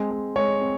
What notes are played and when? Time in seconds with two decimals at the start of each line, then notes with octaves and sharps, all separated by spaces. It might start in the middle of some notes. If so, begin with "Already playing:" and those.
Already playing: G#3 C4
0.11 G#3
0.36 G#3 C#5
0.61 C4